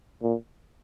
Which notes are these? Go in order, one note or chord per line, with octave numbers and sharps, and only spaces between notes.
A#2